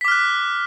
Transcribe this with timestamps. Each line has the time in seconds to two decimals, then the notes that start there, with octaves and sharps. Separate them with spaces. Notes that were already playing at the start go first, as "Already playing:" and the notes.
0.01 B6
0.05 D6
0.08 F6
0.11 F#6